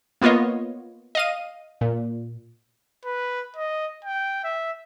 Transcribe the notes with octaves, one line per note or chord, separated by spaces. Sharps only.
A#3 B3 F4 C#5 D#5
D#5 F5 D#7
A#2
B4
D#5
G5
E5